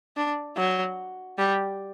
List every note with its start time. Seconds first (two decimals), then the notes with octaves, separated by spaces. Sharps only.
0.17 D4
0.56 F#3
1.38 G3